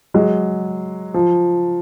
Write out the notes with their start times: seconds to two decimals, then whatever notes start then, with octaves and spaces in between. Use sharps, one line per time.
0.14 F#3 G#3
1.14 F3